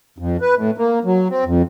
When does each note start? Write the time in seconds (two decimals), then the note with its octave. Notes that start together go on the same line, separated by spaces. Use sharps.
0.18 F2
0.41 B4
0.56 A2
0.77 A#3
1.05 F#3
1.30 C4
1.45 F2